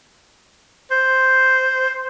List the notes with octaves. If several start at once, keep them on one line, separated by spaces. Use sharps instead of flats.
C5